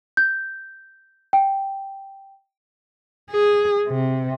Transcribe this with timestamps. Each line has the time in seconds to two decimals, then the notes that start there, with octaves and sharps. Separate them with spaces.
0.17 G6
1.33 G5
3.31 G#4
3.87 C3